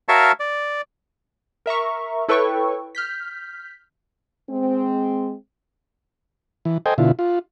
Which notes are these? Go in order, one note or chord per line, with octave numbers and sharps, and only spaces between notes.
F#4 A#4 C#5 E5 F5 A5
D5
A#4 E5 A#5 C#6
E4 A4 B4 C#5 G5 C#6
F6 G6 B6
G#3 C4
E3
A4 C5 D#5 G5 G#5
B2 D3 E4 F4
F4